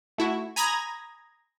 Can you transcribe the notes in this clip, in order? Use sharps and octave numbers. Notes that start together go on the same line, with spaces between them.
A3 E4 F#4
G#5 A#5 B5 D#6 G#6 A#6